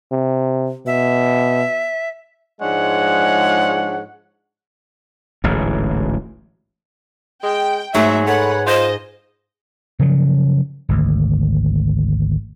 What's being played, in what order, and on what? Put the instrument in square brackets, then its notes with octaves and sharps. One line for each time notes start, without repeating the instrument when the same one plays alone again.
[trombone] C3
[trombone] B2 [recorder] E5
[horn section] G#2 F3 G#3 D4 C#5 F#5
[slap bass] D1 A1 G#2
[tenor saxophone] G#3 [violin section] G5
[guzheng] G#2 [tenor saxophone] F#3 [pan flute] A3 [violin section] E5
[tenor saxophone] A3 [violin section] B4 F#5 [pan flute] C#5
[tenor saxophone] F4 [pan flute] C5 [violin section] D#5
[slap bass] C#3 F3 F#3
G#1 D2